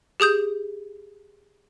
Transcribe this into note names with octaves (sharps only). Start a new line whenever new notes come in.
G4 G#4 D#6 G6